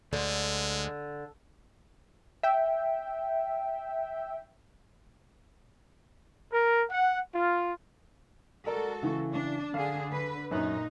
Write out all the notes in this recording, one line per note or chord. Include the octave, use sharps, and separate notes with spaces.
D2 D3 G#3
E5 G5
A#4
F#5
F4
G#3 F#4 A4 A#4 D5 A#5
C#3 E3 C#6
D4
D3 D4 G#4 F5
D3 B4
F#2 A#2 C#4 D#4 F#6